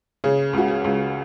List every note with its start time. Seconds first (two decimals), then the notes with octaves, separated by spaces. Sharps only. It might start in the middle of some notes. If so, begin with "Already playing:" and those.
0.24 C#3 G#4
0.53 C#2 F#4
0.68 G#4
0.84 C#2